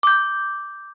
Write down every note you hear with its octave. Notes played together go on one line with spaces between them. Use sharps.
D6 G6